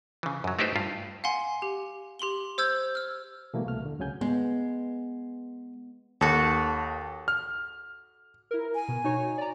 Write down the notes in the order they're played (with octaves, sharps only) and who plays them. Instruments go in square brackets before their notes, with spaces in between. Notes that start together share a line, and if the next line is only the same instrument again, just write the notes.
[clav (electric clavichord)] C#3 E3
F#2 F#3
A3 D#4 E4 G4 B4 C5
G2 F4
[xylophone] F5 F#5 G#5 C6
G4
G4 C6 F#7 G7
C5 E6 G6 G#6
E6 F6
[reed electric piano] B2 E3 G3 A3 A#3
C2 A3 F6
D#2 D3
C#2 C#3 F#3 G#5 G6
[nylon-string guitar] G#3 [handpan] B3
[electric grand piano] D#2 [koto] F#4 A4
[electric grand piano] F6
[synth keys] E4 A#4
[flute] G#5
[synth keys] B2
D#4 F#4 C#5
D5 A#5